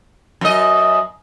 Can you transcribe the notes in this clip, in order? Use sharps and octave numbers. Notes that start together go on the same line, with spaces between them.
F#2 D#5